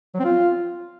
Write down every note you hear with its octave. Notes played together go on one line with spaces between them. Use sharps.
F#3
C4
F4